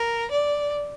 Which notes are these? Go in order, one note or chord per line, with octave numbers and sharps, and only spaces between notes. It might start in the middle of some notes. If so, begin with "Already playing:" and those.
Already playing: A#4
D5